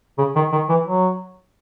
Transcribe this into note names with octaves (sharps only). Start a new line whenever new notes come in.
C#3
D#3
D#3
E3
F#3